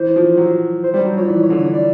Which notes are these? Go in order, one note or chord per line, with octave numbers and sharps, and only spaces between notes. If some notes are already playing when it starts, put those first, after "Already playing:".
Already playing: E3 C5
F3
F#3
C5
G3 C5
F#3
F3 C#5
E3 D5
C#5
D3
C#5
D5